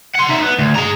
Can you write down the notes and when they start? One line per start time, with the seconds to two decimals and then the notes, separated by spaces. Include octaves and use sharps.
0.15 F#5 C6
0.29 D#4 E5
0.42 B3
0.58 D2
0.75 G#4 A#5